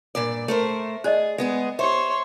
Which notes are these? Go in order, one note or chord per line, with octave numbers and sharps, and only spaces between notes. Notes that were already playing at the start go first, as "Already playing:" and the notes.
G2 A#2 D5
A3 A#4 C5
G#4 C5 D5 D#5
G#3 B3 G#4
G4 C5 C#5 E5 C6